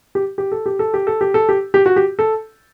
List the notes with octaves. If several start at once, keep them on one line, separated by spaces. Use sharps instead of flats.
G4
G4
A4
G4
A4
G4
A4
G4
A4
G4
G4
F#4
G4
A4